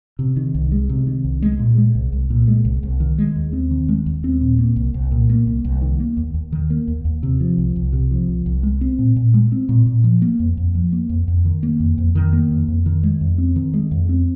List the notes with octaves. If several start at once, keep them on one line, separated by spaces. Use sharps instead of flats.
C3
D#3
C2
G#3
C3
D#3
C2
G#3
A#2
G#3
C2
C2
A#2
G#3
C2
C2
D#3
G#3
D#2
C4
D#3
G#3
D#2
C4
A#2
A#3
C2
C2
A#2
A#3
C2
C2
D#3
A#3
D#2
D#2
D#3
A#3
D#2
D#2
C3
F3
C2
C2
C3
F3
C2
C2
G#3
C4
A#2
A#2
G#3
C4
A#2
A#2
F3
A#3
F2
F2
F3
A#3
F2
F2
D#3
A#3
F2
F2
D#3
A#3
F2
F2
D#3
G#3
F2
C4
D#3
G#3
F2
C4